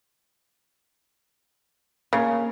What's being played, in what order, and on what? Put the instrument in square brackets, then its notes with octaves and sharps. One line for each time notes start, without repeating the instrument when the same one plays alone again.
[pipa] C#3 [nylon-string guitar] A#3 A#4